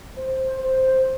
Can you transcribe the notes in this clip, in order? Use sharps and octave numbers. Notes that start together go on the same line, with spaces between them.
C5
C5